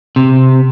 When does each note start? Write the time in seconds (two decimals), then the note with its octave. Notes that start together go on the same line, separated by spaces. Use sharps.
0.16 C3